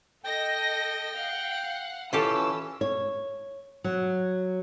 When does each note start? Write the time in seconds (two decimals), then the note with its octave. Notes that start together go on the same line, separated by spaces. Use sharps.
0.24 A4 D#5 G5 A#6
1.15 F5 F#5
2.13 E3 C#4 F4 G4 A4 E6
2.81 C#5
3.84 F#3